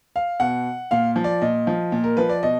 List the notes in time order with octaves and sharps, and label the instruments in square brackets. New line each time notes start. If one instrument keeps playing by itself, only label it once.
[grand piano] F5
B2 F#5
A#2 F5
F3
D5
A#2 D#5
F3
A#2
A#4
F3 B4
D5
B2 D#5